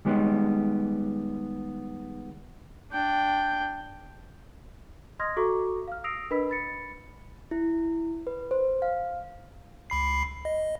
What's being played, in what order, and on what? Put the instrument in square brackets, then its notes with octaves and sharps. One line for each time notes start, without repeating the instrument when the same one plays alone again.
[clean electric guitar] D#3 G3 G#3 B3 G4
[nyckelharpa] D4 G5
[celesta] D#5 C6 D#6 F6 G#6 A#6
F#4 A4 E5 A#5 C#6 D6
F5 F6
D#6 E6 A#6 C7 D7 F7
D4 A#4 B4 D#5 B5 B6
B5 A6 C#7
[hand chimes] E4
B4
C5
F5
[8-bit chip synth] C#2 B5 C7
D#5